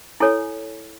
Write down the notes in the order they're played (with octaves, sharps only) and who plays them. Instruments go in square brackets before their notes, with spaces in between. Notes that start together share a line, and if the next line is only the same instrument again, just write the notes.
[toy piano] E4 A4 C#5 G#5